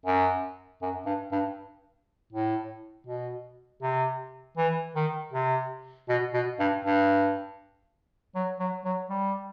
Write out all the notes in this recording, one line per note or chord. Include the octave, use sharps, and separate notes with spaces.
F#2
F#2
G2
G2
A2
B2
C3
E3
D#3
C3
B2
B2
G2
G2
F#3
F#3
F#3
G3